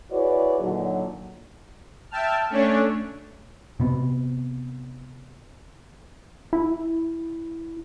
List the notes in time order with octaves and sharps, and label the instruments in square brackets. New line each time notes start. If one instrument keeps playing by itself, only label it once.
[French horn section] E4 F#4 G#4 B4 C#5 D5
A#2 D3 D#3 F#3
[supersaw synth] E5 G5 A5 F6
A3 C#4 D4 C#5
[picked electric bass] C3 B3
[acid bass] E4